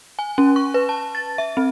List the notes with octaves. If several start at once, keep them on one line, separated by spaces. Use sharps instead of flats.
G#5
C#4
C#6
B4
A5
A6
E5
C4